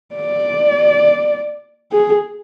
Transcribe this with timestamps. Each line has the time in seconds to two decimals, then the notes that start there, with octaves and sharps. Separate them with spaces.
0.15 D5
1.92 G#4